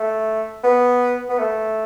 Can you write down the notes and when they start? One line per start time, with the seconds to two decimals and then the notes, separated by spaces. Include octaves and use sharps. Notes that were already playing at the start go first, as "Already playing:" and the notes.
Already playing: A3
0.63 B3
1.29 B3
1.39 A3